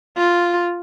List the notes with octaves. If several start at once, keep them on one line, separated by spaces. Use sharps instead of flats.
F4